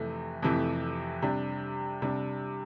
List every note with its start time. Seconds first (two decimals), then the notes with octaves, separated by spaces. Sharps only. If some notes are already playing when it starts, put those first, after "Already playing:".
Already playing: F2 C3 E3 A3
0.42 F2 C3 E3 A3
1.23 C3 G3 D4
2.02 C3 G3 D4